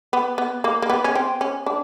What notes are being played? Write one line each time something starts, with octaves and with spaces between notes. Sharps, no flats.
B3
B3
A#3
A#3
B3
C#4
C4
C#4
D4